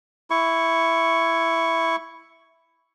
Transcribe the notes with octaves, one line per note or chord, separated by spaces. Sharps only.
E4 C#6